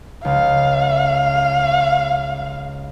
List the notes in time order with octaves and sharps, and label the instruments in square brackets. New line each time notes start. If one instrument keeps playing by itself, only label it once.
[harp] C#2 [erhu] F5